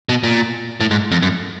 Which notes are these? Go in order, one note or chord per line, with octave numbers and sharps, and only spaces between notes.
B2
A#2
A2
G#2
F2
F#2